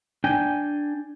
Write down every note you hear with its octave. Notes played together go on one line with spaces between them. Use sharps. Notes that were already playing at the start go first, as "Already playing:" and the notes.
D4 G5 G#5